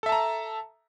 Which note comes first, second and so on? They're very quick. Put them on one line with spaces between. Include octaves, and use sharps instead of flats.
A4 E5 A5 A#5